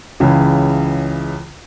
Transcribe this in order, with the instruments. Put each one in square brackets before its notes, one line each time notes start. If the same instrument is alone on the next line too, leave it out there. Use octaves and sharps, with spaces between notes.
[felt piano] C#2 C#3 E3